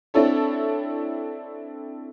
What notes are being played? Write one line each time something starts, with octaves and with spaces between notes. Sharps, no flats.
C4 D4 E4 A4 C#5